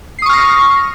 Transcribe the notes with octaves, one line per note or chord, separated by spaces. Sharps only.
C#6 D#6 F6 A#6 C7